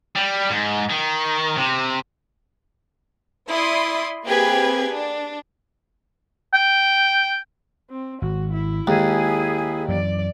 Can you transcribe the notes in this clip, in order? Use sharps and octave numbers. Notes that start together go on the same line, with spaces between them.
G3
G#2
D#3
C3
E4 D5 B5 C6 D#6
A#3 C4 G4 G#4 B4 G#6
D4
G5
C4
G#1 F#4
E4
D#2 G#3 G#4
F#2 E3 D5